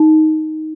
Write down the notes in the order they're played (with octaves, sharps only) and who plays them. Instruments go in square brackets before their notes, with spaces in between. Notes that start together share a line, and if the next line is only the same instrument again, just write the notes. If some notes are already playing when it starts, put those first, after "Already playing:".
Already playing: [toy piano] D#4